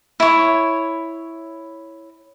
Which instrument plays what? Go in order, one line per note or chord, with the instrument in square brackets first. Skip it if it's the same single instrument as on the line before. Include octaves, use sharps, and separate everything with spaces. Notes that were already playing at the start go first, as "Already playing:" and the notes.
[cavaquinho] E4 C#5